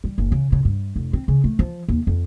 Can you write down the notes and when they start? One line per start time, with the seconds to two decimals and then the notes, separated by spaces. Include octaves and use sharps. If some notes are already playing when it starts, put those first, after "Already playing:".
0.04 G3
0.18 F#1
0.32 C#3
0.52 C#3
0.65 G2
0.96 F1
1.13 C4
1.28 C#3
1.44 A3
1.59 F3
1.88 D#2
2.07 F2